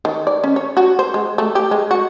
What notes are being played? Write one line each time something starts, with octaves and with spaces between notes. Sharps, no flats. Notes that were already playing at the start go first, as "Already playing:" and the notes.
D#3
D5
C#4
C#5
F#4
C5
G#3
A3
G4
G#3
F#4